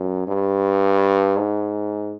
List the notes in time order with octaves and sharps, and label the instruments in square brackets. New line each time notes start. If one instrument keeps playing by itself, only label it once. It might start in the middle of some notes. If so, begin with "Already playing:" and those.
Already playing: [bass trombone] F#2
G2
G#2